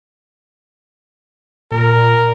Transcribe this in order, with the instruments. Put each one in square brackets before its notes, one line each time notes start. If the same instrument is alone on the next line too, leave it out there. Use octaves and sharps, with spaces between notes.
[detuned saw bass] A#2 [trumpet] A#4